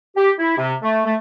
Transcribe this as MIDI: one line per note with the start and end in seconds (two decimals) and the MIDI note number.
0.16 0.30 67
0.38 0.54 64
0.57 0.73 48
0.83 1.00 57
1.05 1.14 57